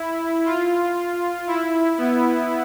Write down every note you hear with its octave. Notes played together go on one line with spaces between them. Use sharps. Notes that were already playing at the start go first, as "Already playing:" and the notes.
Already playing: E4
F4
E4
B3